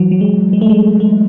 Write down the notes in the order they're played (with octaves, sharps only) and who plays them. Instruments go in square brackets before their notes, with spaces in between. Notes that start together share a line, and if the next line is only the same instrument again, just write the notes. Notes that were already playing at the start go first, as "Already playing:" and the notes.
Already playing: [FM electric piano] E3 F#3
F#3
G#3
G#3
A3
G#3
A3